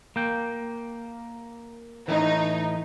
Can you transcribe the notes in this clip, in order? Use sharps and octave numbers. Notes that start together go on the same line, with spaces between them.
A#3 G5
A2 E3 D#4